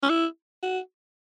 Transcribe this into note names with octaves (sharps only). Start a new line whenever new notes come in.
C#4
E4
F#4